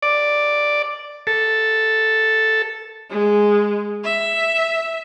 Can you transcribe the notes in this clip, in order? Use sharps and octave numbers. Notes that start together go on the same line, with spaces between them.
D5
A4
G#3
E5